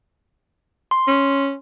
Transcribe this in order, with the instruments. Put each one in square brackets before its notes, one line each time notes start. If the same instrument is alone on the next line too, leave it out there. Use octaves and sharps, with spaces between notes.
[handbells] C6
[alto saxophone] C#4